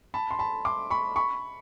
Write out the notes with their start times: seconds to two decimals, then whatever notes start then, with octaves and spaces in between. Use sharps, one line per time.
0.14 A5 B5
0.31 C6
0.39 A5 B5
0.65 C6 D6
0.90 B5 C#6
1.16 B5 C#6